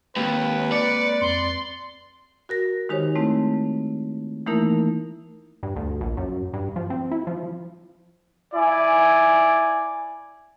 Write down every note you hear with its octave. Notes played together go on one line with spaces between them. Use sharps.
D#2 G#3 A#3 C4 B4
D5 C#7
F2 C4 C6 C#7
F#4 A#4 A#6
D#3 G#3 D#4 G4 C5 C#5
G#3 A3 C4 E4
E3 A3 A#3 D#4 E4 A#4
G2
D2
A#1
F#2
G2
F3
C4
E4
F3
E4 D5 G#5